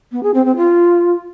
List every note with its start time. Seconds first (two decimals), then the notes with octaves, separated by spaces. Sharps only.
0.12 B3
0.23 G#4
0.34 C4
0.45 C4
0.56 F4